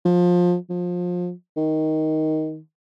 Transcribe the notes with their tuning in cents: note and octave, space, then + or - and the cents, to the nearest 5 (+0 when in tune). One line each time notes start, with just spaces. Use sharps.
F3 +20
F3 +25
D#3 +10